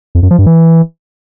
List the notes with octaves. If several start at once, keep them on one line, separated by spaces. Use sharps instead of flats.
F2
F#2
F3
G2
E3